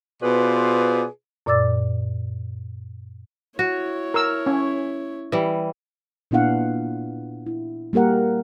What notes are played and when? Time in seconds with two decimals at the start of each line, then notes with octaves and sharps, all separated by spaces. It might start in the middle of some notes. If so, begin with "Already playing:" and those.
0.23 B2 F4 G#4 B4 C5 D5
1.46 F#2 A#2 D5 D6 E6 A6
3.59 E4 F#4 C#5
4.14 A#4 E6
4.46 C#4
5.32 E3 G3
6.31 A#2 B3 D4 E4 F5 F#5
7.46 E4
7.93 G3 A#3 G4 A#4 F#5